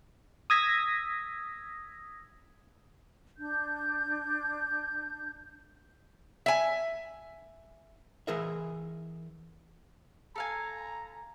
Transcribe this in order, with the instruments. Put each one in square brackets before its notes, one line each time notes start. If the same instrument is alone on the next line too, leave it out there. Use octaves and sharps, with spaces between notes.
[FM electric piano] D#6 E6 G#6 A#6 B6
[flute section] D4 G6
[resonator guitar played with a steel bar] E5 G#5
[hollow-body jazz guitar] E3 G#4 A#4 E5
[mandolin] A4 F5 G#5 [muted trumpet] A#5